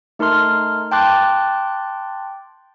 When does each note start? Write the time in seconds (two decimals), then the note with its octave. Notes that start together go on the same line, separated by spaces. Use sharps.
0.19 A3 D#4 A#4 A5 C6 F6
0.91 G5 A5 C6 D6 F#6 A6